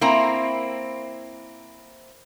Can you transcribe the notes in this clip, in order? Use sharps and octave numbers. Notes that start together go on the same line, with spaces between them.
A#3 C4 E4 A#5